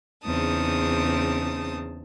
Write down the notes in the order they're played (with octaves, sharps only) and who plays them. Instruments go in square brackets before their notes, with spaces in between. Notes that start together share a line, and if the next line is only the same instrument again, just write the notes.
[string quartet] E2 C#3 C4 D#4 A5 D#6